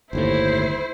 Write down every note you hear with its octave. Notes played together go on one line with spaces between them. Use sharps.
G1 D#2 A2 E4 C5